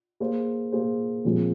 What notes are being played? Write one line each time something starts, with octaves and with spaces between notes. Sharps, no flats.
A#3 G#4 C5
A#3 G#4 C5
A#2 F3 G#3 C4